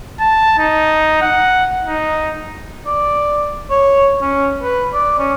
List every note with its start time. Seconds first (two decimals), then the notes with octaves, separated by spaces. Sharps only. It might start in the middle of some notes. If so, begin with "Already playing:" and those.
0.20 A5
0.58 D#4
1.22 F#5
1.85 D#4
2.86 D5
3.70 C#5
4.22 C#4
4.63 B4
4.94 D5
5.19 C#4